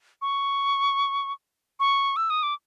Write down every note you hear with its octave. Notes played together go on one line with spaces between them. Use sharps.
C#6
C#6
E6
D#6
D6